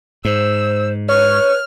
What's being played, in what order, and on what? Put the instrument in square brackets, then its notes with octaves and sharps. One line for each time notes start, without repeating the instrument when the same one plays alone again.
[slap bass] G#2 [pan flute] C5 [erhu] E6
[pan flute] B4 [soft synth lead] C#5 [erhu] F6